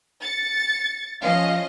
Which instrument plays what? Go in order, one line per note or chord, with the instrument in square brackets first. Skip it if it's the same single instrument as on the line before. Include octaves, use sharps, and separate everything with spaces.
[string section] A6 C#7
[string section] F3 C#4 D#5 [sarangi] F5